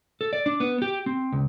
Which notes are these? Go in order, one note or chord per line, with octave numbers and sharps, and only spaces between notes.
A4
D5
D4
B3
G4
C4
C#2